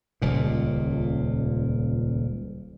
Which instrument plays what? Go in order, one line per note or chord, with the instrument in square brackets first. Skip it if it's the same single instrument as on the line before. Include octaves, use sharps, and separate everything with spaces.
[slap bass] D#1 C#2 A#2